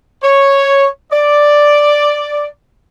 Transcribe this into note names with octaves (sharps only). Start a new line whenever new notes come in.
C#5
D5